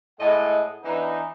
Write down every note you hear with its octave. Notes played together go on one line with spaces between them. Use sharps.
A2 G#3 D#5 F#5
E3 B3 D4 D#4